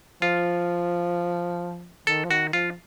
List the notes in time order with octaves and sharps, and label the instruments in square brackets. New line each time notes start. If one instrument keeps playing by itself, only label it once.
[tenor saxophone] F3 [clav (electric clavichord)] F4
[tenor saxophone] D#3 [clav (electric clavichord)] A4
[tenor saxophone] F3
[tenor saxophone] D#3 [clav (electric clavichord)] F#4
[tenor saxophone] F3 [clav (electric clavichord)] F4